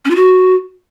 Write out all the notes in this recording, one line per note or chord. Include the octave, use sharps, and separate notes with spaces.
C#4
F4
F#4